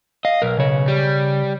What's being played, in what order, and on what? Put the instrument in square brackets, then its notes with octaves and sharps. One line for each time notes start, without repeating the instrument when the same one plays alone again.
[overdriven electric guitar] D#5 [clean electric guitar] F5
[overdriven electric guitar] B1 [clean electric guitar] A#4
[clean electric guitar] C#3 C#5
[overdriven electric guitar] G3